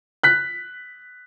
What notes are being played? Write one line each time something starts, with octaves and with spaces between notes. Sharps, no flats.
F#6 B6